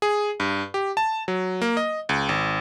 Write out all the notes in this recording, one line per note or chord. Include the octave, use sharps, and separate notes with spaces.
G#4
G2
G4
A5
F#3
A#3
D#5
C#2
G#1